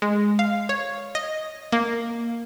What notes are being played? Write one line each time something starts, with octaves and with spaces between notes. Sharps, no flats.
G#3
F5
C#5
D#5
A#3